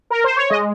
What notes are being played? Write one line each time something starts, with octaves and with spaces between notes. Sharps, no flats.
A#4
C5
C#5
G#3 D#5